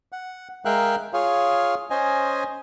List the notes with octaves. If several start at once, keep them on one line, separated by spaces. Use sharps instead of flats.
F#5
G#3 A#4 E5 F5 G5 F#6
F4 G#4 C#5 F5
C#4 C5 D#5 G#5